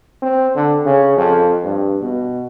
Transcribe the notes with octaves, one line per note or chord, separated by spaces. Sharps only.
C4
D3
C#3
F2
G2
B2